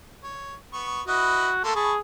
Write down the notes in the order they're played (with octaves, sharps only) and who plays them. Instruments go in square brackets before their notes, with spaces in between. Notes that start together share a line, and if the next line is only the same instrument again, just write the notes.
[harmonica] C#5
B3 C#6
[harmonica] E4 B4 D#5 [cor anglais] F#4
[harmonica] A3 A#3 C6 [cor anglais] A4
[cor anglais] G#4 [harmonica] A5 B5 C#6